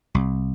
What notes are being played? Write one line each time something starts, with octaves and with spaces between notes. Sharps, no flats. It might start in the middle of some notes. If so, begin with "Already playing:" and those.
C2